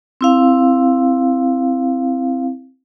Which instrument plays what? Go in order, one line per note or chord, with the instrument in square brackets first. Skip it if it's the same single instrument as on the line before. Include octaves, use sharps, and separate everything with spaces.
[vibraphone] C4 E4 F5